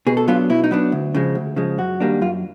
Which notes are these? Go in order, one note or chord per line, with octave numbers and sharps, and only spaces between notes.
B2 G#4
A4
F#3 B3 D4 F4
B2 E4
D#4
F#3 B3 D4
D2
C#3 F3 G#3
D2
C#3 F3 G#3
F#2 F#4
D#3 G3 A#3 D4
F#2 F4